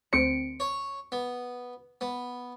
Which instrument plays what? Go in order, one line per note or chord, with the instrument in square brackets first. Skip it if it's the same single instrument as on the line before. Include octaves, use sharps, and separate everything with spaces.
[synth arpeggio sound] D2 C4 C5 [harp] C#7 D7
[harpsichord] C#5
B3
B3